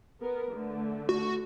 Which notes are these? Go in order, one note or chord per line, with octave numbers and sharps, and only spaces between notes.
B3 A#4
D3 A3
F#4